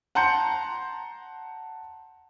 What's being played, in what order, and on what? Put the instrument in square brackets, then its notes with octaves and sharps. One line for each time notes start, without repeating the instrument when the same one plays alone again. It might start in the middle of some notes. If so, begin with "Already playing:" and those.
[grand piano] F#5 A5 A#5 C6 G6 C#7